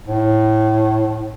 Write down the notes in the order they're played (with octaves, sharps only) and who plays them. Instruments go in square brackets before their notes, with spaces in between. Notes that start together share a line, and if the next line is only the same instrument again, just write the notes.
[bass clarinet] A2